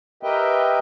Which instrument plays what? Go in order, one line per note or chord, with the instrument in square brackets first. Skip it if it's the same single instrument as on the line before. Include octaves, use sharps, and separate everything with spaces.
[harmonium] G4 A#4 B4 D#5 E5 G5